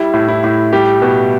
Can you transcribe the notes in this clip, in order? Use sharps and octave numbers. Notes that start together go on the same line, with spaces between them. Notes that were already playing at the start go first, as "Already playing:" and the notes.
Already playing: G3 E4
A2
E4
A2
G3 G4
B2